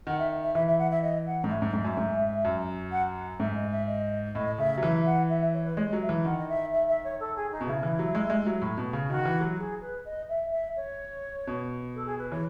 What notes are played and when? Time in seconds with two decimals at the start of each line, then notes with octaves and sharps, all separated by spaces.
0.07 D#3 F#5
0.18 E5
0.42 E5
0.54 E3 E5
0.67 E5
0.79 F#5
0.90 E5
1.02 D#5
1.26 F#5
1.44 G#2
1.49 A2 E5
1.62 G#2
1.73 G#2
1.85 F#2
1.97 G#2
2.45 F#2
2.92 F#5
3.40 G#2 E5
3.55 D#5
3.71 E5
3.87 D#5
4.34 A2 D#5
4.58 C#3 E5
4.78 F#3
4.82 E3 E5
5.06 F#5
5.29 E5
5.41 E5
5.53 C#5
5.65 B4
5.77 G#3 C#5
5.89 D#5
5.93 F#3
6.01 E5
6.09 E3
6.25 D#3 F#5
6.37 D#5
6.48 E5
6.72 E5
6.88 E5
7.04 C#5
7.19 A4
7.36 G#4
7.51 D#4
7.61 B2
7.67 C#3 E4
7.83 E3
7.99 F#3
8.15 G#3
8.30 G#3
8.46 F#3
8.61 A2
8.78 B2
8.93 C#3
9.10 D#3 F#4
9.25 E3
9.41 F#3
9.57 G#4
9.81 B4
10.05 D#5
10.29 E5
10.52 E5
10.76 C#5
11.47 B2
11.95 A4
12.06 G#4
12.18 B4
12.31 E3 C#5